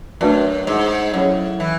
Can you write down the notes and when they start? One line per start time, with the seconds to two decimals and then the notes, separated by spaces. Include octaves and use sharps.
0.21 F#2 A3 D4 F#4 B4 D5
0.67 G#2
1.14 A2 F#3 C#4 G#4 C#5
1.60 E3